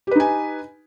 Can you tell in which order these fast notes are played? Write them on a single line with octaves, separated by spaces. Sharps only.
G4 B4 D#4 G#5